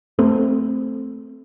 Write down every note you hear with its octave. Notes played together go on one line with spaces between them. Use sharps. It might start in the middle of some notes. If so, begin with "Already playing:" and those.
A3 C4